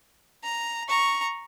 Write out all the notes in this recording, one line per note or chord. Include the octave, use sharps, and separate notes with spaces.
A#5
A#5 C#6